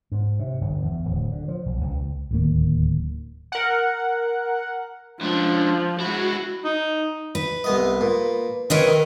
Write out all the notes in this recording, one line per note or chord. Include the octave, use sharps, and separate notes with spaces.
G#2
C3
G1
E2
D1
D3
F3
B1
C#2
D1 D#2 A#3
A#4 F#5
C#2 D3 F3
G#3 E4 F#4
D#4
B4
C2 B3 D#5
A#2
C4 A#4 B4 C#5 D#5
D#3